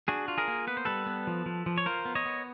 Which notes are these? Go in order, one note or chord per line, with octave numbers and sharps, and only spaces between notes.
D4 F#4 G#4
F4
G#4 A#4
A#3
B3 B4
C5
G3 A4 B4
B3
F3
F3
F3
C#5
F4 A#4 C5
B3
C#5 D#5
B3